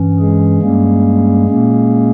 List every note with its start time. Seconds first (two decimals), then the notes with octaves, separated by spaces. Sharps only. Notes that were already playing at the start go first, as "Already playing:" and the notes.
Already playing: G2 E3 C#4
0.19 G#3 G#4
0.62 G2 G3 A#3 C#4
1.47 A#2 A#3 C#4